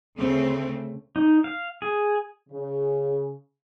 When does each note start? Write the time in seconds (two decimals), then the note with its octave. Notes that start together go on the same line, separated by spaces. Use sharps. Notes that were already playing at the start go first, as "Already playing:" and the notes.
0.18 D2 C#3 A3 C4
1.16 D#4
1.44 F5
1.82 G#4
2.49 C#3